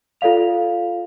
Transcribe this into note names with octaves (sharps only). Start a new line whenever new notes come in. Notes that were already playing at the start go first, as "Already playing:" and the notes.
F4 A4 D5 F5 F7